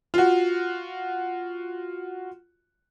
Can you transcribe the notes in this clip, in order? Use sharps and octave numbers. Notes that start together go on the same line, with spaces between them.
F4 F#4